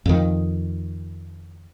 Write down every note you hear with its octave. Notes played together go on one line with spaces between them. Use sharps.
F2 D#3